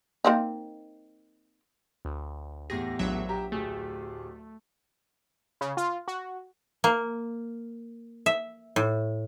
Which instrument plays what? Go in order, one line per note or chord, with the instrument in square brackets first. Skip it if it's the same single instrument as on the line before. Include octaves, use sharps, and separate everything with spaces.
[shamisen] A#3 C4 D#4
[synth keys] D2
[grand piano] E2 A2 G4 [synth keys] G#4 A#6
[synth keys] A#1 F#3 E5
[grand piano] G4 A#5
[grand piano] D1 G4 G#4 [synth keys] A3
[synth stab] C#3
F4
F#4
[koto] A#3
E5
A2